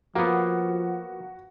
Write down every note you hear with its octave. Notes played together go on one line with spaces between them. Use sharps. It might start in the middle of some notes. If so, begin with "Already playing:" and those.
F3 A#3 B3 F#4